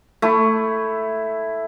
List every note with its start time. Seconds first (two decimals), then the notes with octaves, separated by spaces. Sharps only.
0.22 A3 E4